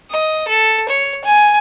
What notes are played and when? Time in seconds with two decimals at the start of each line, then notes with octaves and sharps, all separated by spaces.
0.11 D#5
0.48 A4
0.89 C#5
1.24 G#5